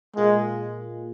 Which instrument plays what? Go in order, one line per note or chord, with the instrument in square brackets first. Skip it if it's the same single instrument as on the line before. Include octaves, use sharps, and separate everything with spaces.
[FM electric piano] A#2 A#3 F4 G#4 [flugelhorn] G#3